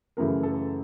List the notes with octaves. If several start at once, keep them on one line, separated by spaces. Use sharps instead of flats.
F#2 C#3 E3 A3 A#4
A4